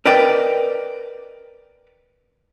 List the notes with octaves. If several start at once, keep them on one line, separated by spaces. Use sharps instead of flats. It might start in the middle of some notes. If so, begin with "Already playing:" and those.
A#4 B4 D5 D#5 G5